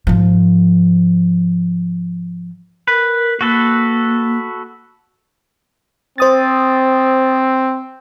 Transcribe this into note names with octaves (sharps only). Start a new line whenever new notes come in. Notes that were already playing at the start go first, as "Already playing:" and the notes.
G#2 F3
A#4 B4
A#3 F#4 A4 B4
C4 C5 D#6 A6